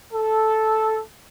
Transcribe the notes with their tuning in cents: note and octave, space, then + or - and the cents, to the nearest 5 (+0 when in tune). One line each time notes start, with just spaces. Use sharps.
A4 -5